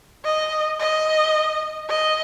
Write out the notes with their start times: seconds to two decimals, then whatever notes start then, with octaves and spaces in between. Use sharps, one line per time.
0.24 D#5
0.80 D#5
1.89 D#5